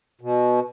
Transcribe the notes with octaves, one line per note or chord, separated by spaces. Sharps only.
B2